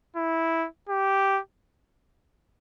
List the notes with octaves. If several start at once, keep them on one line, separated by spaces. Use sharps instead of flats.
E4
G4